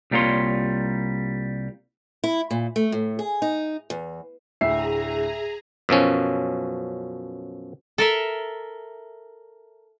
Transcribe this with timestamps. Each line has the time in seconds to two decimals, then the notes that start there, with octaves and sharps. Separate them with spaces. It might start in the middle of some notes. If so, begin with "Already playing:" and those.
0.11 C2 G3 A#3 F4 C#5 C6
2.24 E4
2.51 A#2
2.76 A3
2.92 A2
3.19 G#4
3.42 D#4
3.90 E2
4.61 D2 A2 G#4 E5 A#5 C7
5.89 F#2 B2 F3 C#4
7.98 A4 A#4 E5